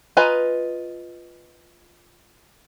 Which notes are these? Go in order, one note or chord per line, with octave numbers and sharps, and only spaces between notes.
F4 B4 D#5 G#5 A#5